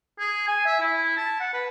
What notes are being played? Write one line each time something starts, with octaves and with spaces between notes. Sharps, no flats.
G#4
G#5
E5
E4
A5
F#5
B4